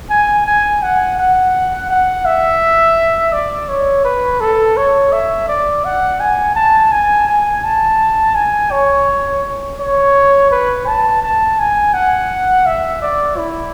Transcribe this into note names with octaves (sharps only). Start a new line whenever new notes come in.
G#5
G#5
F#5
F#5
F#5
E5
D5
C#5
B4
A4
C#5
E5
D5
F#5
G#5
A5
G#5
G#5
A5
G#5
C#5
C#5
B4
A5
A5
G#5
F#5
E5
D5
E4